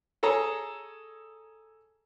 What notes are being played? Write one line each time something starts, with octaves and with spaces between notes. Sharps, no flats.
G#4 A4 C#5 A#5